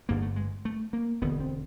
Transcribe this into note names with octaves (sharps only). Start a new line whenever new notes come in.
G1 G2 D3 A#3
A3
G#3
A3
A#3
E1 D2 D3 B3
C4